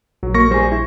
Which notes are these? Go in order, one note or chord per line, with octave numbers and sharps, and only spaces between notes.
A#1 F#3
A#3 C#6 A#6
G3 G#4 C5 C#6
E4